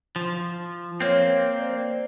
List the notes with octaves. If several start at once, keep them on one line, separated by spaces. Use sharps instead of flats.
F3
A#3 C4 C#5 F5
C5 D5